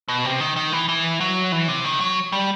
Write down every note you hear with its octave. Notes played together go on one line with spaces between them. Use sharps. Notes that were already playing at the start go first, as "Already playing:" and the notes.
B2
C3
D#3
D#3
E3
E3
F#3
E3
C3
D#3
F#3
G3